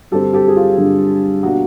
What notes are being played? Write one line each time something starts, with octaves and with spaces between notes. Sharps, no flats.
G2 D3 G3 C4 G4 A4
G4 A4
G#4
F4 G4
G2 D3 G3 C4
B2 G3 A#3 D4 F#4